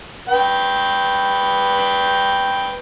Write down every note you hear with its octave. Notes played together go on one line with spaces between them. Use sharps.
B4 G5